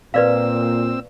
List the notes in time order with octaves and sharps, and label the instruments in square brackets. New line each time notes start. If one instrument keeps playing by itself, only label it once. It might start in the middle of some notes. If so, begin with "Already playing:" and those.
[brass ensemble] A#2 [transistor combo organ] C4 E6 [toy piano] B4 D5 F5